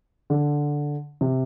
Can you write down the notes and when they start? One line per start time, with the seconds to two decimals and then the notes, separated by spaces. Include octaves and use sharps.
0.30 D3
1.21 C3